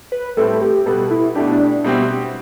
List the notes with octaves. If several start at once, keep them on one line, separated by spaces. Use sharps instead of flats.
B4
A2 G3 C4 E4 A4
G4
B2 G3 B3 A4
E4
B2 A3 D4 E4 G4
D4
B2 G3 C4 E4 G4